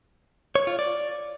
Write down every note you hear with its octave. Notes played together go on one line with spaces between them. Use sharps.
C#5
F4
D5